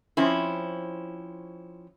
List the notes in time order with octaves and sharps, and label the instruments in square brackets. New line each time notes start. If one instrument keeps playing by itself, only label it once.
[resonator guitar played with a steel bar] F3 C4 C#4 E4